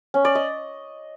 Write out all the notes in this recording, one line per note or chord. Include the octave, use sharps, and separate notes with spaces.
C#4
D5
D#5